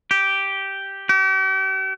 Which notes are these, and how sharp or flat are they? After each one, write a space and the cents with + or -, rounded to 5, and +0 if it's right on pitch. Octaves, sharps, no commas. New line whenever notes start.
G4 -5
G4 -40